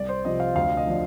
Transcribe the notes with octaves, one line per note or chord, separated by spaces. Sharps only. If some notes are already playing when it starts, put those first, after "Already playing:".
Already playing: C2 D5
C5
C3 F3 C4 D#5
F5
D2 F5
D#5
D3 F3